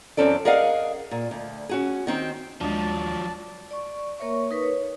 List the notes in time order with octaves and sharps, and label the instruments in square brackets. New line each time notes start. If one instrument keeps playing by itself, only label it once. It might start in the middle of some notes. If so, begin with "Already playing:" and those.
[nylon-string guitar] F#2 E3 C4 C#4 A4 D5
G#4 A#4 D5 D#5 F5 F#5
A#2
D2
C#4 F#4 G#4
D#3 C4 D#4
[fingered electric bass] D#1 D#2 [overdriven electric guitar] F3 F#3 [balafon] G#3 D4 [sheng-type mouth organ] D5 A5
[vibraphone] D5 C#6
A#3 A#4 C#5 E5 C#6
D#4 A#4 B4
C#5